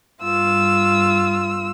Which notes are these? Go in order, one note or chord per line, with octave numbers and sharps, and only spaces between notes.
G2 F4 E6